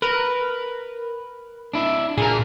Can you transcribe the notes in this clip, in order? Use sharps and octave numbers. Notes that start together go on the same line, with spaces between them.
A#4 B4
D4 E4
A#2 G#4 A#4